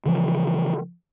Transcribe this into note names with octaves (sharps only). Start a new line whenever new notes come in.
C#3 E3 F3